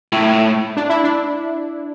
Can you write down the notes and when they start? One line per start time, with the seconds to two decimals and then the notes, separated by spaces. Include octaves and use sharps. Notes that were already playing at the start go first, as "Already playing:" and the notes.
0.12 A2 E4
0.77 D4
0.90 E4
1.04 D4